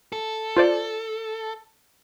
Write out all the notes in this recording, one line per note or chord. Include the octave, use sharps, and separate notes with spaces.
A4
F4 C5 D5